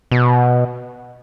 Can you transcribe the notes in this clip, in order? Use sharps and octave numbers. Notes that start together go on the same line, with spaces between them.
B2